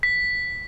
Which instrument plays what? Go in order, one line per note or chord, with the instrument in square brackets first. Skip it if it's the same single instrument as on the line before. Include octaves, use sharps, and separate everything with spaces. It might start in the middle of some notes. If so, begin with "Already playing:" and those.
[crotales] B6